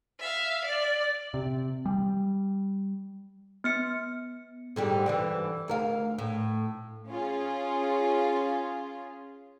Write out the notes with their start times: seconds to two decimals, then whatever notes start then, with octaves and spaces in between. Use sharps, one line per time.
0.20 E5 F5
0.65 D5
1.34 C3
1.86 G3
3.64 B3 F6 C#7
4.76 G#2 D3 G3
5.06 G2 D3 E3
5.68 D2 A#4 F5
6.18 A2
7.07 C#4 F4 G#4